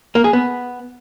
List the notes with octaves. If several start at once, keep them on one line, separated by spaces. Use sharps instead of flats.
A#3
G#4
B3